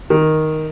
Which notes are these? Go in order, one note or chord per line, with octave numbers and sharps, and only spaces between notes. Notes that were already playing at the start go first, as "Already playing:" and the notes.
D#3